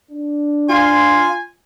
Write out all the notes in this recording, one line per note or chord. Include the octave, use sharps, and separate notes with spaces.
D4
F4 G#5 C6